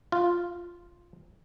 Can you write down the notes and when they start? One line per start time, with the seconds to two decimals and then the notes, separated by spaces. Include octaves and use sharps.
0.12 F4